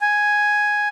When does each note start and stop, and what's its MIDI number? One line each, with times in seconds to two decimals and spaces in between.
0.01 0.88 80